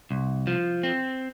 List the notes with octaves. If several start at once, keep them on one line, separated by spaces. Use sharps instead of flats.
C2
F3
C4